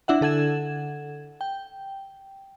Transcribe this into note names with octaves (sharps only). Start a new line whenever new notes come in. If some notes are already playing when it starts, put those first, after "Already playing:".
D4 E4 E5 F#5
D3 A4 F#5 G#6 E7
G5